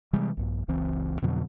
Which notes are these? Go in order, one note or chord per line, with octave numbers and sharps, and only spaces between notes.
C3 E3 G3 G#3
A#1 G2
F#1 C#2 E3 C4
F2 B2 D3 F#3